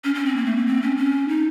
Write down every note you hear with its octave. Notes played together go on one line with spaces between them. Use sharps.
C#4
C#4
C4
A#3
A3
A#3
C4
C#4
C#4
D#4